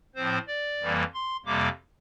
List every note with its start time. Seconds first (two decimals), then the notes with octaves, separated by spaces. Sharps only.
0.15 A2 F3 C4 C5
0.48 D5
0.81 F2 E3 G3 A#3
1.14 C6
1.46 F2 C3 G3 A#3 D6